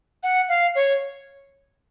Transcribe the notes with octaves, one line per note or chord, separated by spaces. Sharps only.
F#5
F5
C#5